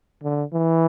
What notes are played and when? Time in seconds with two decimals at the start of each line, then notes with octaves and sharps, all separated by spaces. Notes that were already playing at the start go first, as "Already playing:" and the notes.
0.23 D3
0.53 E3